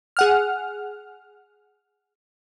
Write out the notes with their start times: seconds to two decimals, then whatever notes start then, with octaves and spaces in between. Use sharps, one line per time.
0.17 G#4 F#5 F6